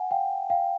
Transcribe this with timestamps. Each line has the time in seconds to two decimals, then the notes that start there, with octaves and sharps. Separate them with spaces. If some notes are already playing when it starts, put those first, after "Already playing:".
Already playing: F#5 G#5
0.11 F5 G5
0.50 F5 G5